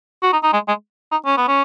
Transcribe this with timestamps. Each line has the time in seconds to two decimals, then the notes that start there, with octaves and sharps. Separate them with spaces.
0.23 F#4
0.33 D#4
0.43 D#4
0.53 G#3
0.68 G#3
1.12 D#4
1.26 C#4
1.37 B3
1.48 C#4